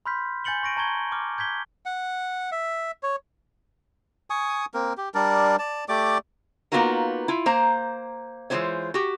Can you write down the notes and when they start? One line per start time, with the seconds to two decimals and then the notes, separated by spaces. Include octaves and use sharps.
0.06 B5 C6 F6 G6 B6
0.44 G#5 G6 A6 C#7 F#7 G7
0.63 C#6 A#6 D7 D#7
0.77 A5 A#5 C#6 G#6 G7
1.12 D6 F6
1.38 G6 G#6 B6 G7
1.86 F#5
2.52 E5
3.03 C#5
4.30 G#5 C#6 D#6
4.74 A#3 C4 A#4
4.97 G4
5.15 G3 D4 A#4 D5
5.59 D5 A5
5.89 A3 G4 D5 D6
6.72 A#3 B3 D#4 F4 F#4 A#4
7.28 E4 F4
7.46 A#3 C5 A#5
8.50 E3 G#3 B3 F4 C5 C#5
8.94 F#4 G4